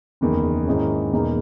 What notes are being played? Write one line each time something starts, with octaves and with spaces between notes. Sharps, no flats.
F#1 E2 D#3
G#2 D#3 G#3 C#4 E4
E2 B2 A#3 D#4 G#4